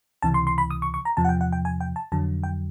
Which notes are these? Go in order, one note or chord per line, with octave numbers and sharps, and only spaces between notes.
C#2 C3 E3 A5
C6
C6
B5
D#6
C#6
C#6
A#5
E2 C3 F3 A5
F#5
G5
F#5
G5
G#5
G5
A5
F2 D3 F#3 A5
G5